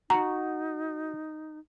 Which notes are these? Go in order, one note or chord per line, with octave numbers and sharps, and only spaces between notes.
D#4 F#4 A#5